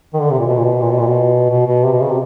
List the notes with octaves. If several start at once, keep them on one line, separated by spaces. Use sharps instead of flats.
D#3
D3
C3
A#2
B2
A#2
B2
A#2
B2
A#2
B2
B2
B2
C3
B2
C#3
C3